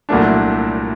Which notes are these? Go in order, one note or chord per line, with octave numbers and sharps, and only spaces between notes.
C2 A#2 F#3 A3 D4